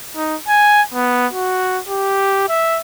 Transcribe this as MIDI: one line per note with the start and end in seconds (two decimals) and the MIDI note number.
0.16 0.36 63
0.48 0.82 80
0.94 1.27 59
1.33 1.80 66
1.88 2.47 67
2.49 2.80 76